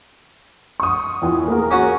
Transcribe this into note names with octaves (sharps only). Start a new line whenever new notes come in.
C#6 D#6
E2 E3 F4
A#3 G#4 A#4
C#4 F#4